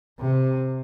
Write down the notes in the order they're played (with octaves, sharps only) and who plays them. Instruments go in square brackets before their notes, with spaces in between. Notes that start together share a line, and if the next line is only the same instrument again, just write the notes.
[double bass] C3